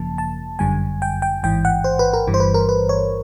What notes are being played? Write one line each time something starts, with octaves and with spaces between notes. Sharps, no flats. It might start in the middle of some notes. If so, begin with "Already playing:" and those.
Already playing: G#1 F#2 C#3 F3 A#3 A5
A5
G1 F#2 D3 G3 G#5
G5
G5
A1 G#2 E3 G5
F#5
C5
B4
A#4
G1 G2 E3 G3
C5
B4
A#4
B4
C#5